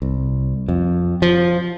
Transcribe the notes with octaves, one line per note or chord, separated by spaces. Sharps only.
C2
F2
F3